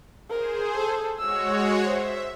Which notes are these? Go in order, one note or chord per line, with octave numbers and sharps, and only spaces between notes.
G#4 A#4 C5
A4
G#3 F#4 C#5 E6
C5 E5